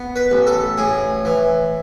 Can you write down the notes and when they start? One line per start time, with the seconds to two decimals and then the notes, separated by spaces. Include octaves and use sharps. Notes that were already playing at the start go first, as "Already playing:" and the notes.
Already playing: B3
0.16 B4
0.31 A1
0.47 A4
0.77 A2 G#4
1.25 E3